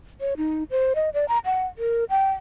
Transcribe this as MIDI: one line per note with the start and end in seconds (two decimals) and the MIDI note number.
0.21 0.34 73
0.37 0.64 63
0.71 0.93 72
0.95 1.10 75
1.14 1.27 74
1.28 1.38 82
1.45 1.66 78
1.78 2.04 70
2.10 2.31 79